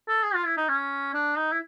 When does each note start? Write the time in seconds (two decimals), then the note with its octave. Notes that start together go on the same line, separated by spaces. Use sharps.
0.08 A4
0.23 G#4
0.34 F4
0.46 E4
0.57 D#4
0.69 C#4
1.14 D4
1.36 D#4
1.52 E4